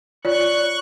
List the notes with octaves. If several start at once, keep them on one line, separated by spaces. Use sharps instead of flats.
F4 C#5 D5 C#6 F#6